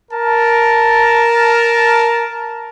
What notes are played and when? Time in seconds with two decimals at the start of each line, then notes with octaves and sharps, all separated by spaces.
0.11 A#4 A5